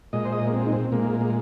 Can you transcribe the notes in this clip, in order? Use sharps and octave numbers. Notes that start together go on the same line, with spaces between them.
A#2 G#3 D#5
C5
D#5
A#3
C4
D#4
C4
A#2 G#3 A#3
A#3